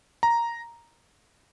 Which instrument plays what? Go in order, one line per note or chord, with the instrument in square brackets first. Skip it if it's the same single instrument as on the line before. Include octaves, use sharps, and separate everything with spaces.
[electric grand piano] A#5